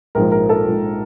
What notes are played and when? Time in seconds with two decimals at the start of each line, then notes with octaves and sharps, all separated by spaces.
0.15 A#1 G#2 F3 A#4
0.32 A#4
0.49 A4
0.67 A#1 G#2 F3